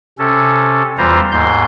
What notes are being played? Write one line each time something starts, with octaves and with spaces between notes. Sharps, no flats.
C3 C#4 A4
E2 E3 G3 F4 C5 A#5
D#2 G#2 C6 G6